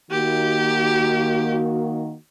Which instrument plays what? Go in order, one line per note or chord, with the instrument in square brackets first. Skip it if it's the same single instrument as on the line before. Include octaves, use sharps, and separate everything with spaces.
[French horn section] D#3 A#3 F#4 [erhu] G4